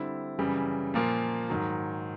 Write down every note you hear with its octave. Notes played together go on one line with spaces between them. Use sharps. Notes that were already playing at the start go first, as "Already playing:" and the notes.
Already playing: D3 G3 C4 E4
F#2 C#3 E3 G3
A#2 F3 A#3
G#2 D#3 F#3